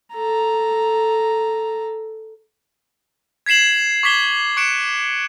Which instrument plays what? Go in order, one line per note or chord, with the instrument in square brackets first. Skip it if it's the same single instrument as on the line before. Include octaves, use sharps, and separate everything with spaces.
[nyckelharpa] A4 A#5
[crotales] G#6 B6 C7 E7 F#7
C#6 D6 G#6 B6 E7 G7
C#6 F#6 C#7 D7 E7